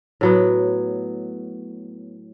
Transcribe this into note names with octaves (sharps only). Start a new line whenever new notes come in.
A2 F#3 B3